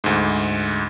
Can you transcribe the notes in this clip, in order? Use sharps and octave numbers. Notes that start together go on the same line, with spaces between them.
D2 G#2